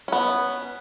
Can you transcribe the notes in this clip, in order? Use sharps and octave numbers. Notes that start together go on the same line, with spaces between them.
B3 C#4